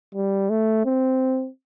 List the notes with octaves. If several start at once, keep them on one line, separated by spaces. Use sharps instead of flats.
G3
A3
C4